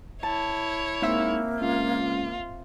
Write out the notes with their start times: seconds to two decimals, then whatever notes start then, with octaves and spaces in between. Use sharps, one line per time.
0.23 E4 C#5 A5
1.02 G#2 A#3 C4 E5
1.61 C#2 F4